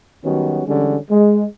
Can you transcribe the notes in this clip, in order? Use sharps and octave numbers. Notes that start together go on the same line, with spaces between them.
D#3 F#3 G3 B3 C#4 F#4
D3 E3 G3 G#3 C#4
G#3